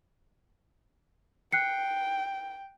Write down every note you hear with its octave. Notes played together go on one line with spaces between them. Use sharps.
G5 F#6 C7 C#7